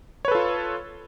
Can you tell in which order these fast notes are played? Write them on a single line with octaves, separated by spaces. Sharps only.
C#5 B4 A4 F4